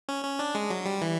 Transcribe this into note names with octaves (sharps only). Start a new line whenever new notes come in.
C#4
C#4
D4
G#3
F#3
G3
E3